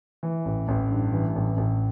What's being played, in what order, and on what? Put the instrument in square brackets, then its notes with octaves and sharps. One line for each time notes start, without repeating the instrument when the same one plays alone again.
[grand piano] E3
A1
A1
G2
E3
A1
A1